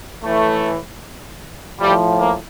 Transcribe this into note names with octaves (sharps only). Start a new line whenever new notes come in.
A2 E3 A3
A2 F3 G3
A#3